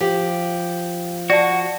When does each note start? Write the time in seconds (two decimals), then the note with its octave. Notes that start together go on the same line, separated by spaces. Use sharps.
0.01 F3 G4
1.30 F#4 D5 F#5 A5